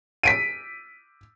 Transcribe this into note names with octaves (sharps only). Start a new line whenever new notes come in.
B6 D7 D#7